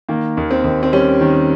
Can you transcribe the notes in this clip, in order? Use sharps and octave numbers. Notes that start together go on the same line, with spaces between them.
D#3 A#3
D#2
C4
D#2
C4
G3 C#4
D#3